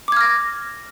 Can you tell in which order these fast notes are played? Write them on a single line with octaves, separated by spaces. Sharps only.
D6 G#6 F6 A#6